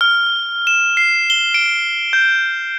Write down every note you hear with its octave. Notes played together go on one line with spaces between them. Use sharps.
F6
E7
C7
G7
D7
G6